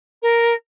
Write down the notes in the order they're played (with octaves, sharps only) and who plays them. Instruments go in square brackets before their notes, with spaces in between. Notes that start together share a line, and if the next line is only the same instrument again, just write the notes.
[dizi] A#4